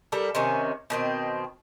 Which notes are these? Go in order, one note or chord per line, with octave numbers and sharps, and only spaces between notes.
G3 A4 A#4
C3 D#3 C#4
B2 D#3 C4